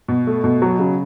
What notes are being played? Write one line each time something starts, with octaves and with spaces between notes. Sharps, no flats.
B2
A3
B2
F#3
C#3